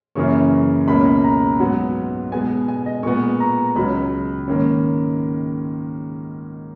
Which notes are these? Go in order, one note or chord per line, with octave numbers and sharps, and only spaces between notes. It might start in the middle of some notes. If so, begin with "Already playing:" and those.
F#2 C#3 E3 A#3 C#4 C#6
C#2 B2 A#3 C#4 B5
A#5
G#2 F#3 B3 F#5
B2 G#3 B3 G#5
G#5
D#5
A#2 G#3 B3 C#6
A#5
C#2 C#3 F#3 C#4 B5
G#2 D#3 A#3 C#4